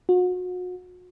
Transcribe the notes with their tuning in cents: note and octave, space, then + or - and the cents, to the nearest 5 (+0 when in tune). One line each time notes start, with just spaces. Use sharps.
F#4 -35